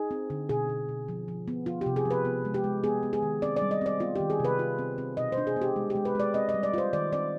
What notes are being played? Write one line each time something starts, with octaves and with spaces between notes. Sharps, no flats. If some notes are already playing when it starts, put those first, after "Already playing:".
Already playing: D#4 G#4
C4
D3
B2 G#4
B2
B2
F3
F3
B3
F3 F4
C3 G4
G#4
F3
B4
B3
G#3
G4
G#3
B3 G#4
B3
G#4
D#3
C4 D5
D5
G3
D#5
C4 D5
B3 F4
D#3 G4
G#4
C3 B4
F4
C4
C4
B2 D#5
C5
D4
G#4
B3
G4
G#3
G4
G#3
B4
G#3 D5
C4 D#5
D#5
G3
D5
F4 C5
D#3 D5
C4 D5